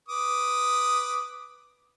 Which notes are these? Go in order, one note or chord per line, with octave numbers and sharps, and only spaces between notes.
B4 D6 D#6